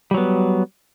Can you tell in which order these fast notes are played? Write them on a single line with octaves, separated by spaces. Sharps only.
G3 F#3 B3